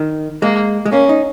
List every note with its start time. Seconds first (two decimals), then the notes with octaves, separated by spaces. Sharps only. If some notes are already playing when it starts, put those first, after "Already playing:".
Already playing: D#3
0.42 G#3 A#3
0.86 G#3
0.92 A#3 C#4
1.09 D#4